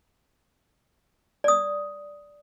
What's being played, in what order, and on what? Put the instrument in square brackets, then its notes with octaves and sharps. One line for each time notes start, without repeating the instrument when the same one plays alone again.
[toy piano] D5 D#6